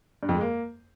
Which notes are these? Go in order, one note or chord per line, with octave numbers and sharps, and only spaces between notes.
G2
F2
G#3
A#3